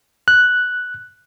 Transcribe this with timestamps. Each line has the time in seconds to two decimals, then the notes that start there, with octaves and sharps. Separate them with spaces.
0.28 F#6